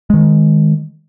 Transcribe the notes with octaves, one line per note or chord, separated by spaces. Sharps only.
D#3 G#3